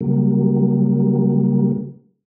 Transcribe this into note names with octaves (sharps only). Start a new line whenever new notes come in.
C#3 F#3 G3 A#3